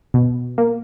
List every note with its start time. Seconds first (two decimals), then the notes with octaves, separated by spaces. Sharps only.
0.14 B2
0.58 A#3